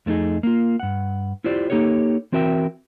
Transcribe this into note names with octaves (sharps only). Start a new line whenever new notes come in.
F2 A3 C4 D#4 G#4
A#3 F4
G2 F#5
E4 F4 G4 C5 D5
A#3 D#4 G4 A4 C#5
E3 C4 F#4 A#4 E5 G5